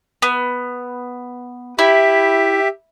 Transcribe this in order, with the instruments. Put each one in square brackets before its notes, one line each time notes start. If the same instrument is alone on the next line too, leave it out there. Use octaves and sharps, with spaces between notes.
[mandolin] B3
[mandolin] E4 [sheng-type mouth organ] G4 E5